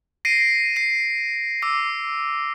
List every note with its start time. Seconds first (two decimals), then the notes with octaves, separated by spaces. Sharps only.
0.25 A#6 C7 D7 D#7
0.76 C7 D#7
1.62 D6 E6 C7